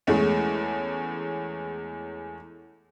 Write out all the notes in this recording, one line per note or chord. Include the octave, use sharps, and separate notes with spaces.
E2 G#3 A3 C#4